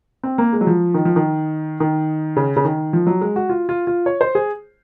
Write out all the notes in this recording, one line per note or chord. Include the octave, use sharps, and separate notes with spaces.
C4
A#3
G#3
F#3
F3
D#3
F3
D#3
D#3
C#3
C#3
D#3
F3
F#3
G#3
F#4
F4
F4
F4
C#5
C5
G#4